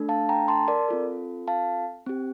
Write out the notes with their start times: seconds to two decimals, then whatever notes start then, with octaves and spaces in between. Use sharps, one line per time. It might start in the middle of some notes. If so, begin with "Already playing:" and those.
Already playing: A3 D4 A4
0.09 F5 A5
0.29 G5 A#5
0.48 A5 C6
0.68 A#4 D5
0.88 C4 F4 A4
1.48 F5 A5
2.06 C4 G4